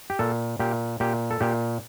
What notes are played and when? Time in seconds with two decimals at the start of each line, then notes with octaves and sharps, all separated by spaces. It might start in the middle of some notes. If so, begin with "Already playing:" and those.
0.10 G4
0.19 A#2 A4
0.60 A#2 G4
1.00 A#2 G4
1.31 A4
1.40 A#2 G4